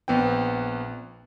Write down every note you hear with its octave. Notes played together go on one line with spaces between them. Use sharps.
A#1 B3 C4 G5